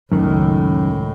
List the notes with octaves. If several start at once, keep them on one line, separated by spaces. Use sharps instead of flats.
C#2 F#2 A2 D#3